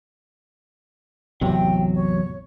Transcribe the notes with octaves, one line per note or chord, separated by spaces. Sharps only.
A1 E2 C3 F#3 G5
C#5